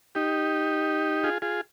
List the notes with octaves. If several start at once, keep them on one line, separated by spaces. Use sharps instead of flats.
D#4 G4
F4 G#4
F4 G#4